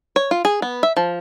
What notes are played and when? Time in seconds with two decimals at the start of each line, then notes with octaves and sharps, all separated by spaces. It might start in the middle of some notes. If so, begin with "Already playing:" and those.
0.16 C#5
0.31 F4
0.45 G#4
0.62 B3
0.83 E5
0.97 F3